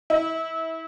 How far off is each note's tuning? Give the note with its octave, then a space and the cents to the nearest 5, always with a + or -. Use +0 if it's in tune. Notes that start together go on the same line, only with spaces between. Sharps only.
E4 -25